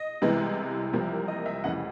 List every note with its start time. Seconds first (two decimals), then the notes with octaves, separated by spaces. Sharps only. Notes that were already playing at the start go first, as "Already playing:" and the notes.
Already playing: D#5
0.22 C2 C3 E3 G#3 B3
0.93 C2 C3 F3 A#3
1.28 D#5
1.46 E5
1.64 F1 F2 C#3 E3 F#5